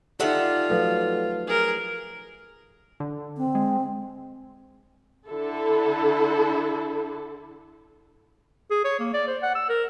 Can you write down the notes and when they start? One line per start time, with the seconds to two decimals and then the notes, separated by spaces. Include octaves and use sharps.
0.20 D3 D#4 F4 G4 E5 F#5
0.70 F3 F#3 A3 A4 B4 F5
1.47 G#4 A#4
3.00 D3
3.37 C4
3.55 G#3
5.26 D3 E4 A4
8.71 G#4
8.85 C#5
9.00 A#3
9.14 D5
9.28 C5
9.43 F#5
9.55 E6
9.69 A#4